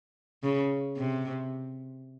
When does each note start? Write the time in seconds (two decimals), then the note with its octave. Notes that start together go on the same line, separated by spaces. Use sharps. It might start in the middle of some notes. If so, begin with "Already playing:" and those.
0.43 C#3
0.97 C3